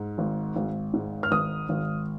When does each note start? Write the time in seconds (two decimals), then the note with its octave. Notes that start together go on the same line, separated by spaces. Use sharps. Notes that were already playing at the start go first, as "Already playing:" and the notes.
Already playing: G#2
0.18 G#1
0.56 G#1
0.94 G#2
1.23 F6
1.31 G#1 D#6
1.69 G#1